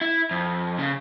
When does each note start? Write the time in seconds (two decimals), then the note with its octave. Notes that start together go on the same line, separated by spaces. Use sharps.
0.01 E4
0.31 F2
0.79 C#3